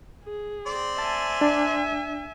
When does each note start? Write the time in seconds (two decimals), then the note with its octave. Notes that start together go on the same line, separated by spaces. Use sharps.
0.24 G#4
0.67 C4 D5 C6
0.99 E5 G#5 A5
1.41 D4